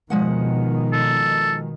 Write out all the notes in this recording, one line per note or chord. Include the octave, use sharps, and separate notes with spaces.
B2 D#3 F3 G#3 F#5
A4